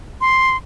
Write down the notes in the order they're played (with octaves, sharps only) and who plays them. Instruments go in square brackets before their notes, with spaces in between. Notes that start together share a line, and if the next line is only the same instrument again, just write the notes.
[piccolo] C6